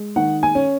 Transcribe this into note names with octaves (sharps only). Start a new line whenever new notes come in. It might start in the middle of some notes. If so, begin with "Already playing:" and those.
Already playing: G#3
D#3 F#5
G#5
C#4